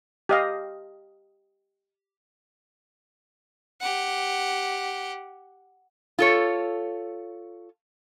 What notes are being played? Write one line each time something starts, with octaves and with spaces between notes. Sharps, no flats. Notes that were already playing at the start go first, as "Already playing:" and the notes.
G4 D#5 F5
G4 F#5
F4 A4 C#5